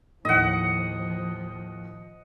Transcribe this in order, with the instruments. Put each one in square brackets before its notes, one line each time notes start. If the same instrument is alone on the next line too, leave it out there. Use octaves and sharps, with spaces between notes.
[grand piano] D#2 A2 [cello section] F3 [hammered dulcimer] D#5 F#5